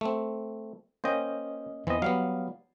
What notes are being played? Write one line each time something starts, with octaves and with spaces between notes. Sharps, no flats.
A3 C4
A#3 C#4 C5 D#5 G5
E2 E3 C4 D#5
F#3 G3 B3 F5